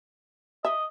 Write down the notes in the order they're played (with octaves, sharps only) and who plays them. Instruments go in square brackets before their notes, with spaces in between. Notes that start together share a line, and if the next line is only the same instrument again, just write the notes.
[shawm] D#5 [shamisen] E5